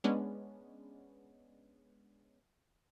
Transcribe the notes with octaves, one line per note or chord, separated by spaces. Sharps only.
G#3 B3 C#4 D4